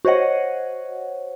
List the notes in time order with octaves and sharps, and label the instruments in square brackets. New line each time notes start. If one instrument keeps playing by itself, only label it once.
[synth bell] F#4 C5 C#5 D#5 F#5